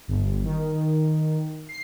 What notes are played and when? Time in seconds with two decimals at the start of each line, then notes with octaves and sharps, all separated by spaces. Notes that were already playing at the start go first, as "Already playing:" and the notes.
0.08 G1
0.44 D#3
1.68 C7